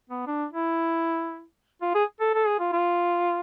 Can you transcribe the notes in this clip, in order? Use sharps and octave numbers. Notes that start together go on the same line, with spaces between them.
B3
D4
E4
F4
G#4
A4
A4
G#4
F4
F4